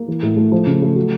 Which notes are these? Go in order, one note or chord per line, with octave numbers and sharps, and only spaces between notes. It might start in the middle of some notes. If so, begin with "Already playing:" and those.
Already playing: A#3
E3
A2
A3
F3
C#3
A3
F#3